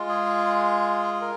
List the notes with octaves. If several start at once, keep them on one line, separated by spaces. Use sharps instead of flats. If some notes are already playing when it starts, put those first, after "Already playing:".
Already playing: G#3 F4
G#4
A#4